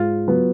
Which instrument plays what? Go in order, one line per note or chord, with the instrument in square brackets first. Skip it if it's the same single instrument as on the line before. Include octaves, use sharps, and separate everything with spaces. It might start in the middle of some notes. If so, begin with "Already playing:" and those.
Already playing: [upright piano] G#2 [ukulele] F4
[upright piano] F#3 B3